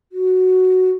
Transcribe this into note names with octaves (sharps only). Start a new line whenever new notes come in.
F#4